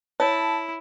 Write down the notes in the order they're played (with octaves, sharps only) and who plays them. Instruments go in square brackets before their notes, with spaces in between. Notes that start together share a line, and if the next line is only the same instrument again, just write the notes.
[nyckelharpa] E4 [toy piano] C#5 [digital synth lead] A5